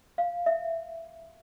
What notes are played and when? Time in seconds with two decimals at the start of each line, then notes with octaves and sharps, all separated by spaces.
0.18 F5
0.46 E5